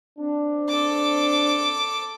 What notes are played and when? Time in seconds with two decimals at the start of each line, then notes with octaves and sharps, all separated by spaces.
0.19 C4 D4
0.68 A4 D6